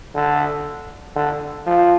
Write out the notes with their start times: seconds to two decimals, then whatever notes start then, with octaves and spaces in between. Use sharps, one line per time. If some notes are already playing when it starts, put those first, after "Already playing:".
0.15 D3
1.16 D3
1.66 F3